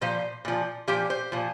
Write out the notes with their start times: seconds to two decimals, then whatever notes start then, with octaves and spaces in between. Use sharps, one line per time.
0.01 A#2 F3 C5
0.45 A#2 F3
0.88 A#2 F3 G4
1.10 C5
1.32 A#2 F3